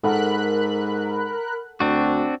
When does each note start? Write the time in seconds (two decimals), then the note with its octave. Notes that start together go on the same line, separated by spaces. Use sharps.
0.04 G#2 A4 A#4 F#5 B5 F#6
1.80 D2 C4 D4 F#4